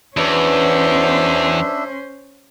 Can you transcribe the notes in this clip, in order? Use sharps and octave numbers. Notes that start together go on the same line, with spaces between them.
E2 F#3 B3 C#4 D4 C5 E5